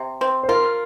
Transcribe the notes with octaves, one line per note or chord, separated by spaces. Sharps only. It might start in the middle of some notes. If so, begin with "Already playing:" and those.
Already playing: C3
C4
C5
F4 A#4